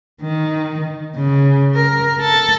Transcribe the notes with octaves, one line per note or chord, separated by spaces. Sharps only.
D#3
C#3
A#4
A4